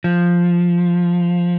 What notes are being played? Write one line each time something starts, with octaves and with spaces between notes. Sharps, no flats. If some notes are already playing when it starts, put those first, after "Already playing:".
F3